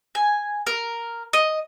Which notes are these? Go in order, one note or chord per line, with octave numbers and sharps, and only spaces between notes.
G#5
A#4
D#5